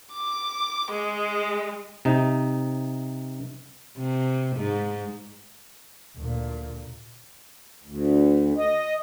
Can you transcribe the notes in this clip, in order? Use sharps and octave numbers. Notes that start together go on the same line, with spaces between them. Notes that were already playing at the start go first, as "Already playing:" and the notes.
D6
G#3
C3 D#4
C3
G#2
D2 A#2
D2
D#5